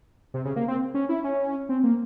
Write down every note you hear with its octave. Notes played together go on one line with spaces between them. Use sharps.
C3
C#3
A#3
C4
C#4
E4
C#4
C4
A#3